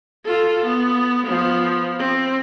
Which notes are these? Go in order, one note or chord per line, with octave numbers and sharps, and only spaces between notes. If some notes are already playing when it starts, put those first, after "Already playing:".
F4 A4
B3
F3 B3
C4